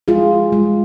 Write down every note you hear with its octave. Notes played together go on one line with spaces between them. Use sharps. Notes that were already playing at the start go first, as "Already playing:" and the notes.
G#3 F4 G#4
G#3